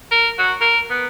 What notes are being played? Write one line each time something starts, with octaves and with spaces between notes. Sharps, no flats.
A#4
F#4
A#4
B3